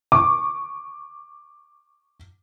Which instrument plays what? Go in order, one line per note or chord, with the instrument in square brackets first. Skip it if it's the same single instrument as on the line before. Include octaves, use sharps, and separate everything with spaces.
[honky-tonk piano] C#6 D6